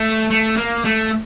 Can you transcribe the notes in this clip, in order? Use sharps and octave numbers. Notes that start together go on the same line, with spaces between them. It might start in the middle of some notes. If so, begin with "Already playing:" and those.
Already playing: A3
A3
A#3
A3